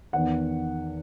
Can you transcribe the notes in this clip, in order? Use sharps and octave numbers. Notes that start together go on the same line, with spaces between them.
E2 D#3 F#5